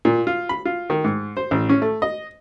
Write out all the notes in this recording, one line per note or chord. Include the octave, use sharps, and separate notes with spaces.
A#2
F4
B5
F4
D#3
G#2
C5
A1
C#4
A3
D#5